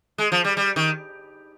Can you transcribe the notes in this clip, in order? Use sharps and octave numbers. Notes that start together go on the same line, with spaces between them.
G#3
F3
G3
G3
D#3